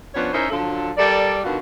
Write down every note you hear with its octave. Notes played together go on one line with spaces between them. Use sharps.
F3 B3 C#4 D4 C#5
C#4 D#4 E4 A#4 C5 E5
D3 F3 F#3 F4 A4
G3 A4 A#4 D5
B2 D3 D#3 F4 F#4